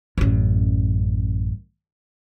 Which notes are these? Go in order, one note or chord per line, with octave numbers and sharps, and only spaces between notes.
A1 F#2